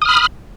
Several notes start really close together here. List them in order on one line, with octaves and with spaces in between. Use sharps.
D#6 F6 B5